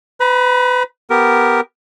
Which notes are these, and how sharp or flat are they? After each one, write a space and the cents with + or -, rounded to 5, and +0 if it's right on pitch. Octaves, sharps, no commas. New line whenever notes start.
B4 +30 B5 -35
B3 +0 G4 +0 A#4 -5